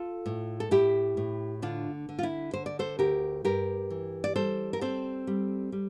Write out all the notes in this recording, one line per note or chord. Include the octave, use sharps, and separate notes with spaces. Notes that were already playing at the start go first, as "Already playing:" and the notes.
Already playing: F4 A4
A2
A4
A2 E4 G4
A2
D3 D4 F4
D3
F4
E4
D3 C5
D5
A4 C5
D2 G4 A#4
G2 G4 A#4
E3
D5
G3 A4 C5
A#4
C4 A4 C5
G3
G3